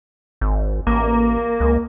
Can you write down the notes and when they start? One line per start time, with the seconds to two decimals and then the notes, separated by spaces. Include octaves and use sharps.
0.41 G#1
0.87 A1 A#3
1.60 C#2